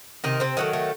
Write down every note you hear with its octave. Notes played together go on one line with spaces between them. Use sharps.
C3 D#3 D#4
C3 C4
D#3 F#3 A3 B3
A3